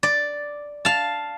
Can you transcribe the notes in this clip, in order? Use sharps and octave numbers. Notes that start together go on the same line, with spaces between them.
D5
F5 A5